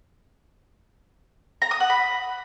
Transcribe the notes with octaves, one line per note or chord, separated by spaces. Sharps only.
A#5
D#6
F#5
B5